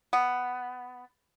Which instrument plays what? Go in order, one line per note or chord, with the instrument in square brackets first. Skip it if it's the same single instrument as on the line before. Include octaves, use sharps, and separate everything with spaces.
[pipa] B3